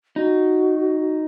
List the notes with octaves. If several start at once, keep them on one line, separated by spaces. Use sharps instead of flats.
D#4 F#4